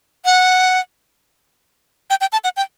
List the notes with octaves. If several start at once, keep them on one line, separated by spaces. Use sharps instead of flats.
F#5
G5
G5
A5
F#5
G5